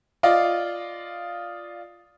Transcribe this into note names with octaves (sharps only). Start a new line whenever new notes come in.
F4 D5 D#5 F5